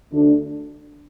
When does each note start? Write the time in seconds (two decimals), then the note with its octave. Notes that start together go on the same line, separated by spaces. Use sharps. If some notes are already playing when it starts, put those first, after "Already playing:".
0.13 D2 D3 A3 D4